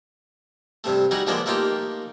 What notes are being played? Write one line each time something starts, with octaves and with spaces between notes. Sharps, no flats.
G2 C3 A3
G3 D#4 F#4 G#4
D3 F3 G#3 A#3 B3 D4
A3 A#3 D#4 F4 G4